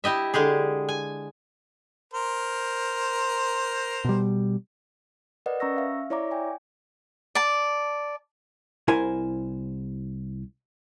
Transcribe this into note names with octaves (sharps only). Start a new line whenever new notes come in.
E4 G4 D#5 E5
D3 G#3 G4 G#4
G#5
A#4 C5
B2 G3
A#4 B4 D5 D#5 F#5
C#4 A#5 C#6 E6 A#6
E5 F5
E4 C#5 D5 E5 A#5 D6
G5 G#5
D5 A5
C2 E4 A#4 C5 G#5